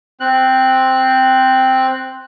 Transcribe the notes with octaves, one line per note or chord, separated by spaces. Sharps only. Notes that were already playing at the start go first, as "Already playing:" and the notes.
C4 F#6